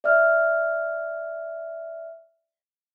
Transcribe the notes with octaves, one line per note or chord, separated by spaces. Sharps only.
D5 E5 F6